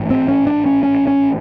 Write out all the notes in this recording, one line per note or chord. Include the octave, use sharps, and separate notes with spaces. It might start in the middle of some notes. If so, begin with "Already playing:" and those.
Already playing: A1 G#2
C4
C#4
D4
C#4
C#4
C#4